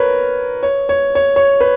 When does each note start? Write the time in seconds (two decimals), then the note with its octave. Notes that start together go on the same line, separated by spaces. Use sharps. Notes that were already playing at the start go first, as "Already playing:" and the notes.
Already playing: A#4 B4 C#5
0.63 C#5
0.89 C#5
1.15 C#5
1.36 C#5
1.60 B4